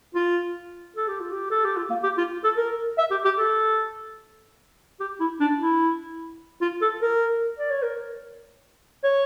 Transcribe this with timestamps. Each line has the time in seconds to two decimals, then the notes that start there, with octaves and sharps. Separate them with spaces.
0.15 F4
0.96 A4
1.08 G4
1.20 F4
1.32 G4
1.50 A4
1.64 G4
1.77 F4
1.90 A#3
2.03 G4
2.17 F4
2.44 A4
2.57 A#4
2.98 E5
3.11 G4
3.24 G4
3.38 A4
5.00 G4
5.20 E4
5.40 D4
5.60 E4
6.61 F4
6.81 A4
7.02 A#4
7.58 D5
7.71 C#5
7.82 A#4
9.03 C#5